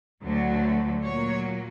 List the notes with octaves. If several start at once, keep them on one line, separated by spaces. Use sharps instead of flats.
D2 D3 F#3 A3
A#2 F#3 A#3 C#5